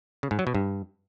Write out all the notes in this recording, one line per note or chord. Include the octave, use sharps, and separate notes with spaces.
C#3
G#2
F#3
B2
G2